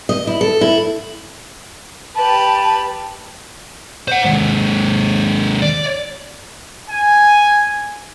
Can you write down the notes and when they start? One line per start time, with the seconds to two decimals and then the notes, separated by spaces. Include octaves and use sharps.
0.09 D#5
0.27 E4
0.41 A4
0.61 E4
2.15 G4 B4 A5
4.08 C5 F#5
4.25 D#2 G#3
5.62 D5
6.90 G#5